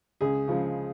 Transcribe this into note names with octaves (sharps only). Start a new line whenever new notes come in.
C#2 G#4
C#3 F3 G#3